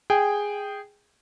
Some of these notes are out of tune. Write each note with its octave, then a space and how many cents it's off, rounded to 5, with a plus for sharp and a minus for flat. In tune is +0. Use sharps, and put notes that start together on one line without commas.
G#4 -10 G5 +0